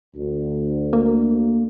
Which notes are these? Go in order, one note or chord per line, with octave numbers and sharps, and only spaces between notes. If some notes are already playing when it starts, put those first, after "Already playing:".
D2
A#3